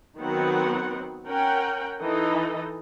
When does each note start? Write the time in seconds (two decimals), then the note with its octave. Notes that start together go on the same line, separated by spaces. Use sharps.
0.18 D#3 F#3 B3 C4 F#5
1.27 C#4 A#4 F#5 G5
2.01 E3 D#4 A4 D#5